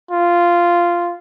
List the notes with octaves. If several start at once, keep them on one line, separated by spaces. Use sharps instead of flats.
F4